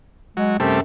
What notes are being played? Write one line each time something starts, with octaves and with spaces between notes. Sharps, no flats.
F#3 G#3
F#2 C3 G3 A3